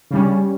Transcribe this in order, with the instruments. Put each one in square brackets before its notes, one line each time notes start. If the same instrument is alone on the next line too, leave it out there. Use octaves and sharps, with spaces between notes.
[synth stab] C#3 G3 C#4